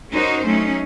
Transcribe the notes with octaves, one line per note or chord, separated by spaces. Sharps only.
C#4 D#4 F#4 A#4 C5
F#3 A3 C#4 D#4